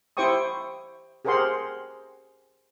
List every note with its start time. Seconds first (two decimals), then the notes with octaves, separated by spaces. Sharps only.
0.17 E4 G4 C5 G5 C#6 D#6
1.25 G4 G#4 A#4 C5 F#5 C6